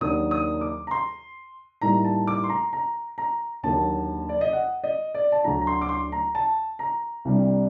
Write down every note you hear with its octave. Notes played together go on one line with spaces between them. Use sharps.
D#2 D#3 F#3 A#3 D4 D#6
D#6
D6
A#5
C6
A2 G3 A#3 D#4 A#5
A5
D6
C6
A#5
A#5
A#5
D#2 D3 F#3 A#3 A5
D5
D#5
F#5
D#5
D5
A5
D2 D3 F#3 A#5
A#5
C6
D6
C6
A#5
A5
A#5
C2 C3 G3 D4